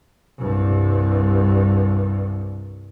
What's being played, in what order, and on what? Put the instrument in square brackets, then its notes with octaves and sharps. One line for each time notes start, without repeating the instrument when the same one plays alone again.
[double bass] C2 G2